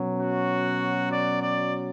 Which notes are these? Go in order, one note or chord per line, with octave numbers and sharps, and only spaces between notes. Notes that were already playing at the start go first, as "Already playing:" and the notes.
Already playing: B2 F#3 C#4
F#4
D5
D5